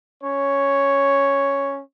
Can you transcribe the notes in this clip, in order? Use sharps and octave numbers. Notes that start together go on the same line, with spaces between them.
C#4 C#5